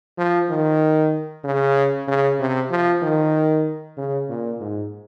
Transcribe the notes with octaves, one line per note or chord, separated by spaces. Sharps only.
F3
D#3
C#3
C#3
C3
F3
D#3
C#3
A#2
G#2